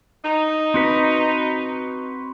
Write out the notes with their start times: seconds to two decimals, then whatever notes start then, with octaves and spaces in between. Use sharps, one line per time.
0.25 D#4
0.74 C4 F#4 B4